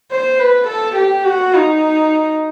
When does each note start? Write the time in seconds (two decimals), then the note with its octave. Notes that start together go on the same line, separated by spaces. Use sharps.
0.11 C5
0.40 B4
0.68 A4
0.96 G4
1.25 F#4
1.54 D#4